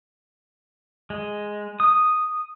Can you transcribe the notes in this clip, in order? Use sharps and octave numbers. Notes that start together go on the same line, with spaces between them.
G#3
D#6